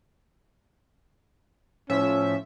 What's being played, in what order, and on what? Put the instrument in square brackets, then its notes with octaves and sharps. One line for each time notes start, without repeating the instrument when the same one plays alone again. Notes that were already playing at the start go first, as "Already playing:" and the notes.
[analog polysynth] A2 F3 E5 [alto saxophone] C#4